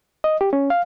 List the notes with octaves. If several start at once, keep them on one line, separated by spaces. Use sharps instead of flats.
D#5
G4
C#4
F5